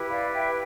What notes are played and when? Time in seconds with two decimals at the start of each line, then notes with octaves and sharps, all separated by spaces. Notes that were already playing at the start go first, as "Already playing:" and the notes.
Already playing: E4 G4 B4
0.10 D5 F5
0.33 E5 G5